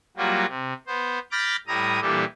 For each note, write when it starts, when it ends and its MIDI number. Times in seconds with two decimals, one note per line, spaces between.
0.17 0.46 54
0.17 0.46 55
0.17 0.46 58
0.17 0.46 65
0.17 0.46 66
0.48 0.74 48
0.87 1.19 59
0.87 1.19 72
1.32 1.56 83
1.32 1.56 86
1.32 1.56 89
1.32 1.56 91
1.32 1.56 93
1.32 1.56 94
1.67 2.00 45
1.67 2.00 55
1.67 2.00 64
1.67 2.00 82
1.67 2.00 87
2.01 2.25 46
2.01 2.25 52
2.01 2.25 55
2.01 2.25 62
2.01 2.25 67
2.01 2.25 69